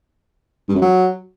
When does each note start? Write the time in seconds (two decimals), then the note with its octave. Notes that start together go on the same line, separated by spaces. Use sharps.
0.68 G2
0.75 F#2
0.82 F#3